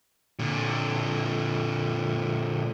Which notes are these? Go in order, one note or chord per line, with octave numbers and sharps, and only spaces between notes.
A#2 D3